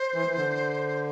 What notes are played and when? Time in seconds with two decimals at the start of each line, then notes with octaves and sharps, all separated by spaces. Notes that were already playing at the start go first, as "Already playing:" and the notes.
Already playing: C5
0.14 E3
0.28 E3
0.37 D3